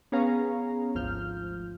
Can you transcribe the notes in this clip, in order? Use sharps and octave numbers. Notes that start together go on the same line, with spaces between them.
B3 C#4 G#4 C#5 F5 A#5
G#1 D2 F3 F6 G6